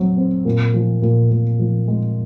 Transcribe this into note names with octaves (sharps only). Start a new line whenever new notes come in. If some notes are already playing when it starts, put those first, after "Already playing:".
Already playing: F#3 C4
C4
A#2
F3
A#2
A#2
F3
G#3